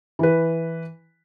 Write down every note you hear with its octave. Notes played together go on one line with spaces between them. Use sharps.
E3 B4